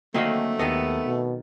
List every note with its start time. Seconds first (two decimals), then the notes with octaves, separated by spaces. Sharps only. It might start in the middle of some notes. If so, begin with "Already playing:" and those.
0.14 D3 F#3 A3 A#3 C4 D#5 F5
0.59 D#2 D#3 B3 A4 D#5
1.06 B2